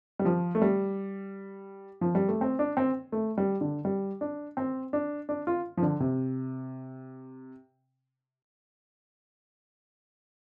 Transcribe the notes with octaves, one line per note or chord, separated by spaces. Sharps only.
G3
F3
A3
G3
F3
G3
A3
C4
D4
C4
A3
G3
D3
G3
D4
C4
D4
D4
F4
F3
D3
C3